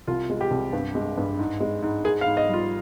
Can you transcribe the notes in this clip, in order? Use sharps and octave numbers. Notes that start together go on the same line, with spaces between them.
C2 F4
G#3
G4
C2
G2
G#3
G2
G#2
G#3
G#2
G#2 G#4
F5
G#2
D#5
G3
F4